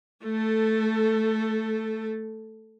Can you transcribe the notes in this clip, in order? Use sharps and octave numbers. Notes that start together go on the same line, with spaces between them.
A3 A4